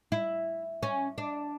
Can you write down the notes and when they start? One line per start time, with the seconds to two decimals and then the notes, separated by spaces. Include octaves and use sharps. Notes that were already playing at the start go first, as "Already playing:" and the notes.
0.12 E4
0.83 C#4
1.18 D4